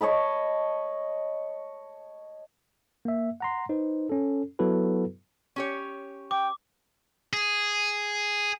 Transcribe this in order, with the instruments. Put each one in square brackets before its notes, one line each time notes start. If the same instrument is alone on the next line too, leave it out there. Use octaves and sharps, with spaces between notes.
[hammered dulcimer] C#5 D#5 A5 B5
[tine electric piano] A#3 E5
F#5 A#5 C6
D#4 B4 C5
C#4 A4
F#3 B3 E4 F#4 A4 B4
[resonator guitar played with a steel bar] C#4 G4 C#5
[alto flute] G5 [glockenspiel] D6
[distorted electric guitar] G#4